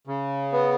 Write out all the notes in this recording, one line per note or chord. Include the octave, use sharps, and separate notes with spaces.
C#3
B3